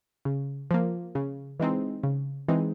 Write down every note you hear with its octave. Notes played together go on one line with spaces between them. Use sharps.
C#3
F3 A#3
C#3
E3 G#3 C4 D#4
C#3
E3 G#3 C4 D#4